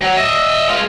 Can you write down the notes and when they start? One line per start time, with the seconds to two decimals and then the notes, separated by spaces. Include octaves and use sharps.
0.01 F#3
0.16 D#5 E5
0.69 G#3 F5